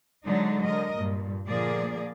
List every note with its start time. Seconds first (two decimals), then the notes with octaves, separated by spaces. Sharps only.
0.25 D3 F#3 G#3 D4 D#4
0.64 D3 A#4 D#5
0.97 G2 A#2
1.46 A#2 D3 F3 A#3 G#4 D5